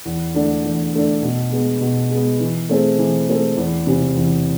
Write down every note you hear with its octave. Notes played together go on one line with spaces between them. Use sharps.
E2
D3 A3 D4
E2
D3 A3 D4
B2
G#3 B3
B2
G#3 B3
E3
A3 C4 G#4
E3
A3 C4 G#4
E2
C3 E3
E2